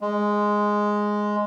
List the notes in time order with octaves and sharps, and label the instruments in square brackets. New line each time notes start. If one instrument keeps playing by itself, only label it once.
[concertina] G#3